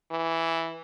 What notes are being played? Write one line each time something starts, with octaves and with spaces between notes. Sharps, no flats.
E3